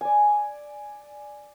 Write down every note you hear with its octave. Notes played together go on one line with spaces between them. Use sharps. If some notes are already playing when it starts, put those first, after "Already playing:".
D5 G#5